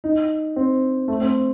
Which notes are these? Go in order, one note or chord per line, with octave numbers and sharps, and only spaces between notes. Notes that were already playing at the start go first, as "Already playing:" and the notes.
D#4
C4
A3
C4